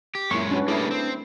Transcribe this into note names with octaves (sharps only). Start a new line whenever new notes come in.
G4
F#2 G#3 A#3 E4 C#6
C#4 D4 F#4 B4
G3 A3 A#3 E4 G#4
C4